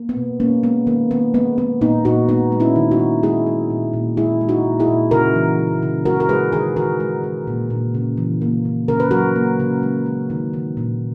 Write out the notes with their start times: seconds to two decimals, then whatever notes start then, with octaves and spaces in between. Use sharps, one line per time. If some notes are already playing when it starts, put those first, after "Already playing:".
Already playing: A#3
0.09 B3
0.17 B2
0.40 G#3 A#3 C#4
0.63 G#3 B3
0.87 D#3 A#3
1.10 D#3 B3
1.34 G#3 B3
1.58 G#3 B3
1.81 A#2 B3 D#4
2.05 A#2 D#4 F#4
2.29 G#3 B3 D#4
2.52 G#3
2.60 C#4 E4
2.76 D#3
2.91 D#4 F#4
2.99 D#3
3.23 G#3 E4 G#4
3.47 G#3
3.70 A#2
3.93 A#2
4.17 G#3 E4 G#4
4.41 G#3
4.49 D#4 F#4
4.64 A#2
4.80 E4 G#4
4.88 A#2
5.11 C#3 F#4 A#4
5.35 E3
5.59 G#3
5.82 C#3
6.05 G#3 F#4 A#4
6.20 A#4
6.29 G#3 G#4 B4
6.52 D#3 G#4 B4
6.76 D#3 F#4 A#4
7.00 G#3
7.24 G#3
7.47 A#2
7.70 A#2
7.94 C#3
8.17 E3
8.42 A#3
8.65 C#3
8.88 C#3 A#4
9.00 B4
9.11 F#3 F#4 A#4
9.36 A#3
9.60 C#3
9.83 G#3
10.06 G#3
10.30 D#3
10.53 D#3
10.77 A#2